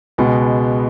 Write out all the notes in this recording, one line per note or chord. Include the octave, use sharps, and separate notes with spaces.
C#2 B2 G#3 B3